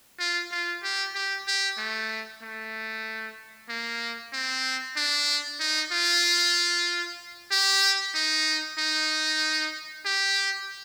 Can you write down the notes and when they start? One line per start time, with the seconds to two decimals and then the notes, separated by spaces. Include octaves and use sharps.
0.19 F4
0.51 F4
0.83 G4
1.15 G4
1.47 G4
1.78 A3
2.42 A3
3.69 A#3
4.33 C4
4.96 D4
5.60 D#4
5.92 F4
7.51 G4
8.15 D#4
8.78 D#4
10.05 G4